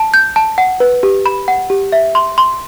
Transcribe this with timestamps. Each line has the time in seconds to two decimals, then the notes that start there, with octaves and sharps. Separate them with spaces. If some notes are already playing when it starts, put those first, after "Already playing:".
Already playing: A5
0.14 G6
0.36 A5
0.58 F#5
0.80 B4
1.03 G4
1.26 B5
1.48 F#5
1.70 G4
1.92 E5
2.15 C6
2.38 C6